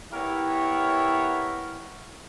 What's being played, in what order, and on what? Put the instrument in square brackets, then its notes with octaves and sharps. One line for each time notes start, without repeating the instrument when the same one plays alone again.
[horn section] B3 E4 G4 A#4 C#5 E5